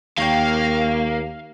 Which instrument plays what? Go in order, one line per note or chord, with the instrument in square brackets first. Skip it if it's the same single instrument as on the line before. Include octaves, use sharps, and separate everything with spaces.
[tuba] D#2 [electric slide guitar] A#3 [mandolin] A#4 C#5 G5 [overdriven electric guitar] F5